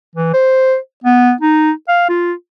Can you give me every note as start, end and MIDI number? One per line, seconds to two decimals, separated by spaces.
0.15 0.31 52
0.34 0.76 72
1.04 1.33 59
1.41 1.71 63
1.88 2.07 77
2.09 2.33 65